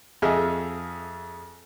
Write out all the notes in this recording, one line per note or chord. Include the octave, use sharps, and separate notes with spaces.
F2 G#4 D#5 E5 E6 F6